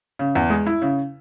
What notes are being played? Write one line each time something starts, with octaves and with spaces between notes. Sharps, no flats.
C#3
E2
G#3
E4
C#3